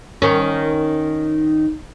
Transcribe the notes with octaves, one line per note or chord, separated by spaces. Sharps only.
D#3 C#4